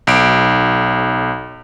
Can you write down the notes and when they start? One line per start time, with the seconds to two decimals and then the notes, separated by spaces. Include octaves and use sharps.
0.07 B1 D7